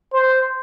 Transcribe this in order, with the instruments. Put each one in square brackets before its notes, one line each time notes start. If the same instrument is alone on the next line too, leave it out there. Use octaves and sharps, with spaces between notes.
[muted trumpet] C5